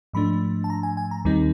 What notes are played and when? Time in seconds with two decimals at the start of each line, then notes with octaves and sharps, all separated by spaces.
0.13 G#2 F3 A3 D4 B5
0.64 A5
0.70 A#5
0.83 G#5
0.97 G#5
1.11 A#5
1.25 D#2 D#3 G3 C4 D#4